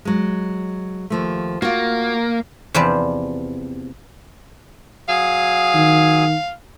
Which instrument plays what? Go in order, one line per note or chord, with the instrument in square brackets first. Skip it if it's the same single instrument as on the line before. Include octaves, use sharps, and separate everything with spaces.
[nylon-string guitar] F#3 G#3
D#2 F3 A3
[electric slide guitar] A#3 [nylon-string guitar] F4 F#4
[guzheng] E2 C3 F3 B4 C5 D5
[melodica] F#3 G#4 D#6 [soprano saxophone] F5
[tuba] D#3